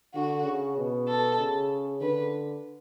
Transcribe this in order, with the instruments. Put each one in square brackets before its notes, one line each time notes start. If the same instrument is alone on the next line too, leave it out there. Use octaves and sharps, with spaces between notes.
[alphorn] D3 [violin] F#4
[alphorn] C#3
B2
[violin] A4
[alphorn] C#3
[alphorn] D3 [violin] B4